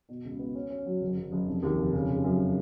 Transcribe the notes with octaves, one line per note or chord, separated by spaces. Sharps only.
B2
C#2
B3
C#4
C#4
F#3
F#1
F#1
F#1
F1
D#2
F1
C#3
C#3
F#2